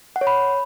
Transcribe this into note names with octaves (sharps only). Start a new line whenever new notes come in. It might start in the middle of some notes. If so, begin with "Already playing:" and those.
F#5
C#5
B5